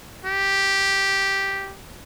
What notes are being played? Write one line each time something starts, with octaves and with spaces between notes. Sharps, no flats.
G4